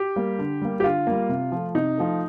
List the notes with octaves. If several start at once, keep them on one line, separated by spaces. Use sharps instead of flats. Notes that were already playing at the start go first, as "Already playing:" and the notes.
Already playing: G4
G3 A#3
D3
G3 A#3
G4
D3 F4
G3 A#3
C3
F3 A3
C3 D#4
F3 A3